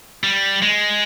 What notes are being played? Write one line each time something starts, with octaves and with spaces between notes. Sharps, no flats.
G3
G#3